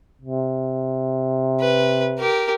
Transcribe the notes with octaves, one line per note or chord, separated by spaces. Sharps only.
C3
B4
G4 A#4